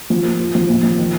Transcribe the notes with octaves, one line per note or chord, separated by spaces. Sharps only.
F3
A#3
F4
F3
A#2
F3
D#3